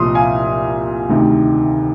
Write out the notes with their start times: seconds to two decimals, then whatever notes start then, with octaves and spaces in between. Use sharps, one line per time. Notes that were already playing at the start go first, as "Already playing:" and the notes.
Already playing: C2 A#2 F3 C6 D#6
0.14 F5 G#5
1.09 D2 C3 D#3